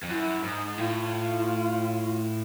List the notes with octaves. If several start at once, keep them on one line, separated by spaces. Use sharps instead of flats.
F2
F#2 E4 F4
G#2 D#4 E4
A2 F4